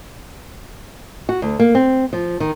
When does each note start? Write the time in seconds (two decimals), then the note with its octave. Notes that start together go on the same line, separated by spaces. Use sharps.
1.29 F#4
1.42 D2
1.60 A#3
1.75 C4
2.13 F3
2.40 D#3